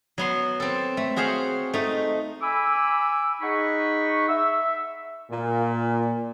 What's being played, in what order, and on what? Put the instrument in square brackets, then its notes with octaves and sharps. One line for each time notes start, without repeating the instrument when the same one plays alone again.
[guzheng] F#3 B3 C6
C4 A4
A3
F#4 G#4 C5 F5 F#5
A3 D#4
[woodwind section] G#5 B5 D6 E6
D#4 G#4 D#5 F#5 B5 C#6
E5 E6
[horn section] A#2